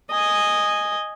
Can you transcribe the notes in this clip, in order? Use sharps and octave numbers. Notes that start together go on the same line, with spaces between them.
D#5 G#5